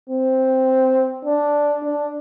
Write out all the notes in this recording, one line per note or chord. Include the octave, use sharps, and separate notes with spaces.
C4
D4
D4